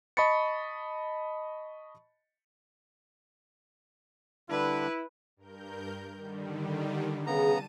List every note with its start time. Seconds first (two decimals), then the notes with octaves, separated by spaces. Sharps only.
0.17 D#5 A5 B5 C#6 A6 C#7
4.50 D3 G3 D4 E4 B4
5.37 G2 A#4 G6
6.14 D3 D#3 G3
7.27 C#3 B3 G#4 A5 A#5 D#7